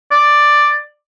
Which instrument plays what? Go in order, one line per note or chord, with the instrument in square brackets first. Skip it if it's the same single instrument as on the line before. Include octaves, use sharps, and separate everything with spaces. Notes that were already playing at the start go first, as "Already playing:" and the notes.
[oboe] D5